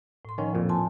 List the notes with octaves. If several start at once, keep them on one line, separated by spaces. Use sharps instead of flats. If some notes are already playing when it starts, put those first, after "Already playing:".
A2 C6
D#3 F3 C#4
F2 A#2
G#5 A5 C6